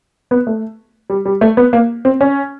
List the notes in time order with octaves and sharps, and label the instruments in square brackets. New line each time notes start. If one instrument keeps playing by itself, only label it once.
[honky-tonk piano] B3
A3
G3
G3
A3
B3
A#3
C4
C#4